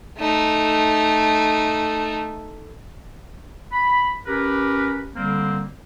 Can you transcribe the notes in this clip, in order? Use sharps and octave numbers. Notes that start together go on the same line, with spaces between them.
A3 D#4
B5
C#4 G4 A#4 B4
D3 G3 A#3 C4